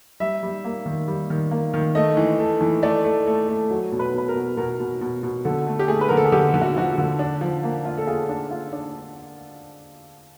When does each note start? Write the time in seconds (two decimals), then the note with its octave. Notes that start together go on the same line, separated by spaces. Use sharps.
0.20 G3 E5
0.43 G3
0.65 A#3
0.86 D#3
1.08 G3
1.30 D#3
1.51 A#3
1.74 D#3
1.95 A3 D#5
2.17 E3
2.39 A3
2.61 E3
2.83 A3 D5
3.04 A3
3.26 A3
3.48 A3
3.70 F#3
3.92 B2
3.99 B4
4.14 B2 B4
4.28 A#4
4.35 B2
4.57 B2 A#4
4.80 B2
5.01 B2
5.23 B2
5.45 D3 A4
5.67 A3
5.79 G4
5.88 A3 G#4
6.01 B4
6.08 D3 A#4
6.17 A4
6.25 G#4
6.32 D3 G4
6.54 D3
6.61 F#4
6.76 F3 F#4
6.98 D3
7.19 D4
7.41 F3
7.63 A#3
7.85 F4
7.98 A4
8.07 F4 G#4
8.29 D4
8.51 F4
8.73 D4